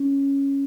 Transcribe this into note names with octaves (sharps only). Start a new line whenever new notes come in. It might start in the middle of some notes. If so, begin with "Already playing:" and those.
Already playing: C#4